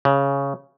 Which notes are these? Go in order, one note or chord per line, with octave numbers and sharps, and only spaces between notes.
C#3